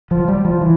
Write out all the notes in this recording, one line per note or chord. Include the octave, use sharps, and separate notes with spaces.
F3
G3
F3
E3